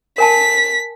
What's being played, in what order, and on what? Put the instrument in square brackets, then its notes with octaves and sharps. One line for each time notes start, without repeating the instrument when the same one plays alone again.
[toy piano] A#4 G#5 A5 [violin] B6